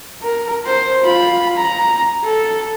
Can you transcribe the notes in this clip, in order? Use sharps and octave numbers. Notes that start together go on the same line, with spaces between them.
A#4
C5
F4 B5
A#5
A4